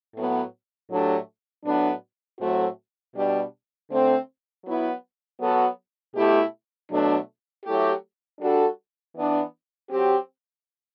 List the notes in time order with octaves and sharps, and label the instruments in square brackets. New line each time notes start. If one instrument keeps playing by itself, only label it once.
[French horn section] A2 F#3 B3
A2 F#3 A3 D4 G4
A2 F#3 B3 D4
A2 F#3 A3 C4 F#4
B2 G3 D4 G4
D3 A3 C4
F#3 B3 E4
F#3 B3 F#4 A4
B2 A3 E4 G4
B2 F#3 A3 D4
F#3 A3 E4 G4
G3 D4 F#4 A4
E3 B3 D4
F#3 C4 G4